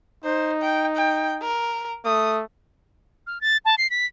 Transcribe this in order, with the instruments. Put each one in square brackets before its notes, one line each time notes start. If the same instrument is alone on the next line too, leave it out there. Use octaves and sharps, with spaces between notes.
[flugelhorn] D#4 [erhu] C5
[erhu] G5
G5
A#4
[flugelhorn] A3 [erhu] D#6
[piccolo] F6
A6
A5
C7
B6